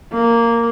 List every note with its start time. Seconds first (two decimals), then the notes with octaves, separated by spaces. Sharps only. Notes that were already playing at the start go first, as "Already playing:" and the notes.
0.13 A#3